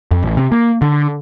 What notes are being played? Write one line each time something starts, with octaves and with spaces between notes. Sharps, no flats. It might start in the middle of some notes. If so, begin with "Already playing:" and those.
F2
A1
C3
A#3
D3